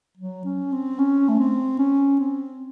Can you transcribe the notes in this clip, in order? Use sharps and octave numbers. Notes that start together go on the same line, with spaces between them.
F#3
C#4
C4
C#4
A3
C4
C#4
C4